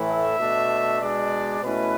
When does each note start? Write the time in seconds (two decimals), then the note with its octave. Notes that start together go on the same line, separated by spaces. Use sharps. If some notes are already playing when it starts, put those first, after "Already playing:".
Already playing: A2 E3 A3 E4
0.09 E5
0.39 B2 A3 D4
1.01 B2 G#3 D4 D5
1.62 B2 A3 C#4 E4 B4